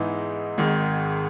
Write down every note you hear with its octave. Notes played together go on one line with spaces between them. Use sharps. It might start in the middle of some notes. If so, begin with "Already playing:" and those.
Already playing: G#2 E3 B3 D#4
G#1 G#2 D#3